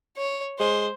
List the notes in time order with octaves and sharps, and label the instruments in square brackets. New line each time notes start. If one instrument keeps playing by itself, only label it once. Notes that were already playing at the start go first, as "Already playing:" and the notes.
[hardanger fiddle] C#5
[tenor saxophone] G#3 [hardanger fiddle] C5